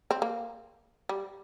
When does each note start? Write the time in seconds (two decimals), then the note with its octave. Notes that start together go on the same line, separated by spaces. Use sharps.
0.11 C4
0.22 A#3
1.09 G3